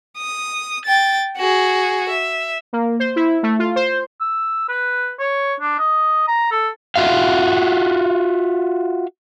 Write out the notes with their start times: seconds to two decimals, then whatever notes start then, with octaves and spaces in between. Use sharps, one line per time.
0.18 D#6
0.85 G5 A6
1.37 F#4 G#4
2.09 E5
2.73 A#3
3.00 C5
3.16 E4
3.43 A3
3.59 F4
3.76 C5
4.21 E6
4.69 B4
5.19 C#5
5.60 D4
5.79 D#5
6.28 A#5
6.52 A4
6.96 F4 F#4 E5 F5